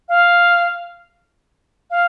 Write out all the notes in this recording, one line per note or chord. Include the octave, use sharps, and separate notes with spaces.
F5
F5